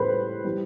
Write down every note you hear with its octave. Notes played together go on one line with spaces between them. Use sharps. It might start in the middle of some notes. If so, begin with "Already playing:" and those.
Already playing: A2 E3 G3 B4 C5
E3 G3